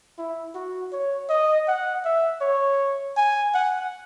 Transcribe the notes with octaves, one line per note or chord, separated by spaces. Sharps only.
E4
F#4
C#5
D#5
F#5
E5
C#5
G#5
F#5